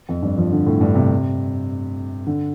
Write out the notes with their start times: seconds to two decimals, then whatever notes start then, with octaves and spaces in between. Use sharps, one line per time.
0.09 F2
0.22 G2
0.38 F3
0.52 D3
0.66 A2
0.81 G2
0.95 C3
2.27 D3